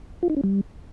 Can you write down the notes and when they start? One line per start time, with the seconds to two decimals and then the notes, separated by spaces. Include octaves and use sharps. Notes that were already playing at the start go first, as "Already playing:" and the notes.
0.23 F4
0.30 D#4
0.37 C#4
0.44 G3